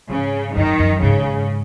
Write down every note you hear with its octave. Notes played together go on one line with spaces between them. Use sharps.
G#2 C#3
F#2 D#3
F#2
G#2 C#3